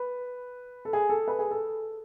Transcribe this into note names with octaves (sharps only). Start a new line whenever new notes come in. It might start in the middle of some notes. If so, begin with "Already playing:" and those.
Already playing: B4
A4
G#4
A4
B4
G#4
A4